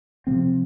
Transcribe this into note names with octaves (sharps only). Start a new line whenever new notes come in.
C3 F3 C4